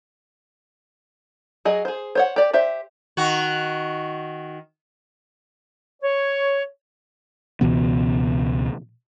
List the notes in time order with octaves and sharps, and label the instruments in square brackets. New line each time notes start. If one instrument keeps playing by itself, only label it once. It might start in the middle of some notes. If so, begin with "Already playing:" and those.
[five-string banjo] F#3 G#4 D#5
G#4 C5
C5 C#5 F#5
G4 D5
G4 C5 E5
[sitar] D#3 F#4
[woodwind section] C#5
[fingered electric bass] C#2 B2 E3 B3